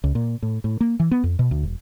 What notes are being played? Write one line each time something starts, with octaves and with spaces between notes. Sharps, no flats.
C#2
A#2
A2
A2
A#3
E3
B3
F2
B2
D2
E1